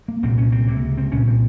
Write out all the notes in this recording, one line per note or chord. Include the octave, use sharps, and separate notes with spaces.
A#3
C2 A#2 C4
C#4
C4
C#2 C3 A#3
C4
C2 A#2 C#4
C4